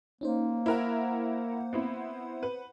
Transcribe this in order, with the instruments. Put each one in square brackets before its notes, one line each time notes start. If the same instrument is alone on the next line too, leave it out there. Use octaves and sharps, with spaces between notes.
[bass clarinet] A#3 [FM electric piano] C#4 D#4 C5
[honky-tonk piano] E4 A#4 [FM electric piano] C5 F#5
[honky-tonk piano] B3 C4 E4
B4